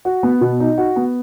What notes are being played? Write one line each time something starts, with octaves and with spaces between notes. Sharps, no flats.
F#4
B3
B2
D#4
F#4
B3